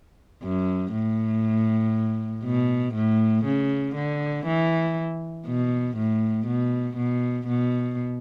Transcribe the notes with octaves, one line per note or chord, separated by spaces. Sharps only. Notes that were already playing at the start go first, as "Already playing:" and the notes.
F#2
A2
B2
A2
C#3
D3
E3
B2
A2
B2
B2
B2